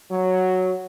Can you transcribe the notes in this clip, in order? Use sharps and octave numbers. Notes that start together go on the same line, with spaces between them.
F#3